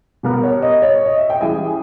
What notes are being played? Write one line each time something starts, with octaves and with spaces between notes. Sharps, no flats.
B2 G3 B3 G4 A#4 B4
C#5
D#5
C#5
D#5
E5
G5
E3 G3 C#4 G#4 G#5